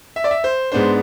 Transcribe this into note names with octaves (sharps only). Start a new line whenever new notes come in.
E5
D5
E5
C5
G#2 G#3 B3 D4 C5